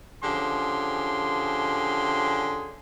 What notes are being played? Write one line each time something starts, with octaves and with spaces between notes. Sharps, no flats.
D3 F3 C#4 G4 G#4 C6